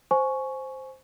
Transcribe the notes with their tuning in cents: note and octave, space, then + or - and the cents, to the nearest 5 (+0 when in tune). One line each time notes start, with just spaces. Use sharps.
C5 +0 G#5 +20 C#6 +0